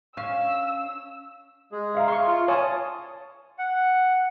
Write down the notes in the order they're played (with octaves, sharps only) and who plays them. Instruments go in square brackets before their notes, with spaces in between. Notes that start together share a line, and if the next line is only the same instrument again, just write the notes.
[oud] C#4 F5 [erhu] E6
[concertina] G#3 G#4
[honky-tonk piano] E5 F5 A#5
[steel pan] C6 C#6
[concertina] F4
[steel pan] C#5 G#5 [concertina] A5 D#6
[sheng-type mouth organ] F#5